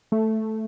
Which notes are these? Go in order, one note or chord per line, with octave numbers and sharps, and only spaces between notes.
A3